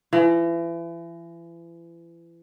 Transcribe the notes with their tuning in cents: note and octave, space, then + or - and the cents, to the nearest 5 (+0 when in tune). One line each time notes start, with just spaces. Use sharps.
E3 +35